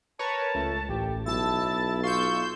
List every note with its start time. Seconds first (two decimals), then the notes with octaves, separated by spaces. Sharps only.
0.19 A#4 B4 C#5 A5
0.55 C#2 A3
0.89 A1 G4
1.26 B1 E4 A5 E6 A6
2.03 F4 C6 C#6 E6 G6